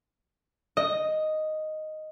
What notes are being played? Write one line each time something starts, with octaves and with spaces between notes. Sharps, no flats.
D#5